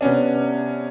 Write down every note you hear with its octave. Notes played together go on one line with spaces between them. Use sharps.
C3 B3 C#4 D4